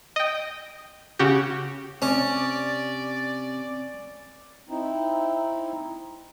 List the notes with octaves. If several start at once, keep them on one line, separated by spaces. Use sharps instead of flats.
D#5 G5
C#3 F#4 G4
C3 C#4 D5
C4 D#4 E4